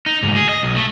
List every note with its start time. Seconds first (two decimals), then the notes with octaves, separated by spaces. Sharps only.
0.06 D#4
0.23 D2 G#2
0.36 G#4
0.49 D#5
0.63 B1
0.76 A3